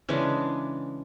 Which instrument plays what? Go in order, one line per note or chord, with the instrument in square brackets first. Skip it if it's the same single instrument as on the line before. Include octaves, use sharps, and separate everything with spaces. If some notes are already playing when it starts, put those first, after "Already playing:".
[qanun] C#3 E3 G#3 D4